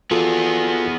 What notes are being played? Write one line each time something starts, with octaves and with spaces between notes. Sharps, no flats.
B3 F4 F#4 G#4 A4